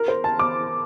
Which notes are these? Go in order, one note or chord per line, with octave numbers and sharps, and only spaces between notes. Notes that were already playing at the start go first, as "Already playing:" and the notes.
Already playing: A#4
C5
A5
D6